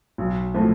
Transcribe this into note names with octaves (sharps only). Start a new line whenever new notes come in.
B1
A2 F3 A3